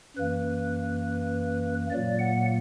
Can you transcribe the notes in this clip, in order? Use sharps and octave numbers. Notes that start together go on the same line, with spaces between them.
F#2 E3 A#3 B4
A#2 F#3 A#3 D5
F#5